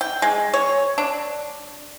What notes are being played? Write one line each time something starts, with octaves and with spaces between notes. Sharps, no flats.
G5
G#3
C#5
D4